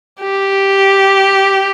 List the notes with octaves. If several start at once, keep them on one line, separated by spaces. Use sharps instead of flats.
G4